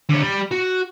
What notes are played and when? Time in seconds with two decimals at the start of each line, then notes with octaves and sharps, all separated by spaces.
0.09 D3 C#5
0.23 G3 B5
0.51 F#4